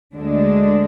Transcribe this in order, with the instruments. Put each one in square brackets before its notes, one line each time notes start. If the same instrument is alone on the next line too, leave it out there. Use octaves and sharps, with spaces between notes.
[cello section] D2 D3 G#3 D4